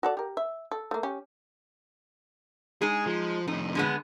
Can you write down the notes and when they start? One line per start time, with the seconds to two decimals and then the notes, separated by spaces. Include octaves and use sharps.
0.03 F#4 A4 D5
0.17 G4 A#4
0.37 E5
0.71 A4
0.91 A3 A#3
1.03 C#4 G4
2.82 G#3 D#4 G#4
3.06 F3
3.47 F2 A2 D#4
3.75 D3 G#3 B3